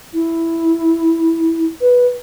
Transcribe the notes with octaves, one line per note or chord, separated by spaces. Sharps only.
E4
B4